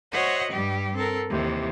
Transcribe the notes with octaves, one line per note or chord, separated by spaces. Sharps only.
F#4 C5 C#5 D#5 E5 F#5
G2 G3 G4
C4 A4 A#4
D#2 C3 E3